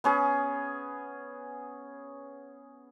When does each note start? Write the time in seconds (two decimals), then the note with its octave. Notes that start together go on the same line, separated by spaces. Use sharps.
0.04 B3 C#4 G#4